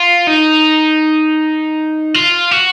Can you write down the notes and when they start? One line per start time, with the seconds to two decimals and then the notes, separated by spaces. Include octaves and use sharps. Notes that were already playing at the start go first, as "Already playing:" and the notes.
Already playing: F4
0.27 D#4
2.14 F4
2.51 F#4